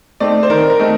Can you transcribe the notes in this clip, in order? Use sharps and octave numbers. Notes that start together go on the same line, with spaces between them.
A3 C4 D#4 D5
C5
D#3 A#4
A#4
A3 C4 D#4